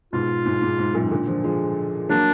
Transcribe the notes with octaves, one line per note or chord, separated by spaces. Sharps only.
G#2 B2 F4
G#2
G#2
G#2
F#2 A#2
D#3
A#2 D3
D3 F3
F3 G#3
F#3 A#3 D4